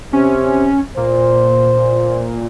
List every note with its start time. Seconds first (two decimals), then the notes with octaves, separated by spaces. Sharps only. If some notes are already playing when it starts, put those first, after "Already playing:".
0.13 C3 C#4
0.97 A#2 C5